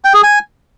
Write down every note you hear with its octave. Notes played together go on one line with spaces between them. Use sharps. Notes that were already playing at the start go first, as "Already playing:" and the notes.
G5
G#4
G#5